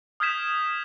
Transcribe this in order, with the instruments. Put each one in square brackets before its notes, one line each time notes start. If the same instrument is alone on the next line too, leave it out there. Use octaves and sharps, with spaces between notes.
[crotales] D#6 F6 G6 G#6 B6 E7